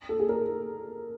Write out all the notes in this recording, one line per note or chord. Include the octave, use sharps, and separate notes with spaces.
A4
G#4
A#4